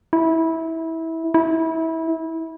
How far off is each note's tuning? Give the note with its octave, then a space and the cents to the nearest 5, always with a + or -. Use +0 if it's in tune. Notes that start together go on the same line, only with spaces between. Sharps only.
E4 -20
E4 -25